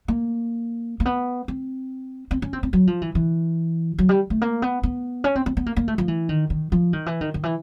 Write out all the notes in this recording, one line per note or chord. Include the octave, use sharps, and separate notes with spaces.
A#3
A#3
B3
C4
C4
C#4
C4
C4
F#3
F3
E3
E3
F#3
G3
A3
A#3
B3
B3
C#4
C4
C4
B3
A#3
A#3
A3
F3
E3
D#3
D#3
F3
D#3
E3
D#3
D#3
E3